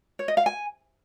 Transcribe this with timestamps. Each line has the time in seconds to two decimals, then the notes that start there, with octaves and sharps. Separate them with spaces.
0.19 C#5
0.28 D#5
0.37 F5
0.46 G#5